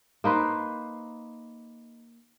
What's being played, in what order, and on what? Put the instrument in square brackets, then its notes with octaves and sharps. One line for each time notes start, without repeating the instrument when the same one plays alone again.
[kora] A#3 D#4 B4 C5